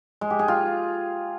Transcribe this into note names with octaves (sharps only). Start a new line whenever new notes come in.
G#3
G4
G#4
F4